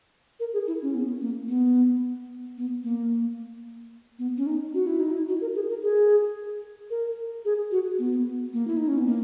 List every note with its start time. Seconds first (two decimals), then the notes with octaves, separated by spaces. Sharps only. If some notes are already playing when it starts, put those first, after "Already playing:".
0.40 A#4
0.53 G#4
0.67 E4
0.82 C#4
0.95 B3
1.21 A#3
1.48 B3
2.57 B3
2.83 A#3
4.19 B3
4.38 C#4
4.46 D#4
4.74 F#4
4.87 E4
5.00 D#4
5.12 E4
5.28 F#4
5.41 A#4
5.55 G#4
5.69 A#4
5.83 G#4
6.90 A#4
7.45 G#4
7.71 F#4
7.99 B3
8.53 A#3
8.67 E4
8.77 D#4
8.88 C#4
8.98 B3
9.07 A#3